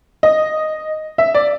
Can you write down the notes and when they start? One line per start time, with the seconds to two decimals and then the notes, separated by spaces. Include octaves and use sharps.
0.23 D#5
1.18 E5
1.34 D5